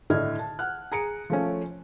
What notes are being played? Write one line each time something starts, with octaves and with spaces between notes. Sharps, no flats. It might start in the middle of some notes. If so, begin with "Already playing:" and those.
A2 D3 D#5 F6 G#6
A5
F#5 F6 F#6
G#4 A#5 C#7 D7
F3 A3 C#4